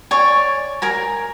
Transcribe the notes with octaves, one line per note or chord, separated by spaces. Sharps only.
C#5 D5 G#5
A#4 G#5 A#5